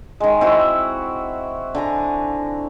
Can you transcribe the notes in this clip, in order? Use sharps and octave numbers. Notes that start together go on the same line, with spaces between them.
D#3 G#3
C4 E4 F#4
D3 G#5 A#5